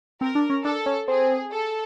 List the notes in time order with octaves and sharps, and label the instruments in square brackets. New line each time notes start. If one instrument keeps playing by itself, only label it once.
[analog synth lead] C4 [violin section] A#4
[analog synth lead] D4
C#4
[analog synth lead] D4 [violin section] A4
[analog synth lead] C#4
[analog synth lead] C4 [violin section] G#4
[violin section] A4